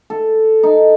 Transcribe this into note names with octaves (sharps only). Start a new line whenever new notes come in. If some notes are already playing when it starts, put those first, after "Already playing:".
A4
D#4